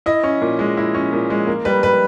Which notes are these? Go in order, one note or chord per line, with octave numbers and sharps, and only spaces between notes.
E4 D#5
C#4
A#2
G#3
E4
C#4
A#2
G#3
A#3
G3 B4
B4